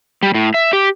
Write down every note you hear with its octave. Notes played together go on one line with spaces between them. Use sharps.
G3
A2
E5
G4